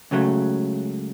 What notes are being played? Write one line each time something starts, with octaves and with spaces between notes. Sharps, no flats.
C#2 C#3 F#3 A3